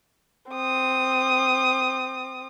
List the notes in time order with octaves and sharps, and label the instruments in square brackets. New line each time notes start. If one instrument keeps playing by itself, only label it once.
[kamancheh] C4 D#6